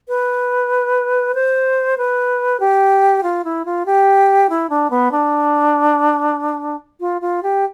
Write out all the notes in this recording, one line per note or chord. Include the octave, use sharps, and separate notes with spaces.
B4
C5
B4
G4
F4
E4
F4
G4
E4
D4
B3
D4
F4
F4
G4